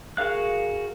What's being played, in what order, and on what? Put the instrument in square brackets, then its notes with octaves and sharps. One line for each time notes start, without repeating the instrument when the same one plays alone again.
[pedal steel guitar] F#4 G#4 A#4 F5 F#6